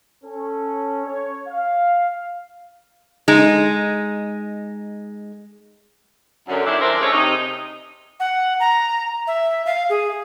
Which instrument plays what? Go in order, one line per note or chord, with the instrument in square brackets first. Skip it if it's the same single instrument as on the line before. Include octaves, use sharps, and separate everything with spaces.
[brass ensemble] C#4 A4
C#5
F5
[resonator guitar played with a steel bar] G#3 D#4
[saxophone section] F#2 D3
D#3 D4 E4
F3 G#3 A#4 C5 D5 E5
A3 C#4 D4 G#4 C#5 E5
C3 D#4
[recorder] F#5
A#5
E5
F5
G#4